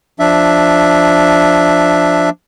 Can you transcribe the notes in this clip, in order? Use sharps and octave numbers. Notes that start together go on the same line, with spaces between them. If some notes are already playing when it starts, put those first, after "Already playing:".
F3 D4 E5